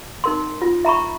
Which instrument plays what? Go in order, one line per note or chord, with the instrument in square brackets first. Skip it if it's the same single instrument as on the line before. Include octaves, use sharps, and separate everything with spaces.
[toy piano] D#4 A#4 C6
F4
E5 A#5 B5 C#6